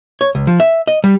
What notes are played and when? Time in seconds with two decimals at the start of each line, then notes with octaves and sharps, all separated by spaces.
0.21 C#5
0.35 C#2
0.47 F3
0.60 E5
0.87 D#5
1.04 G3